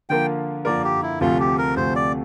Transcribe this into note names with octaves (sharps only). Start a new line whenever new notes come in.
D3 F3 A#3 F4 A#4 G5
D3 F3 A#3 F4 A#4 D5
G4
E4
D2 C3 F3 A3 F4
G4
A#4
D2 C3 F3 A3 C5
D5